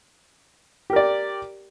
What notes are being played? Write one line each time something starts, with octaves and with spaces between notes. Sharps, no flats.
G4 A#4 D5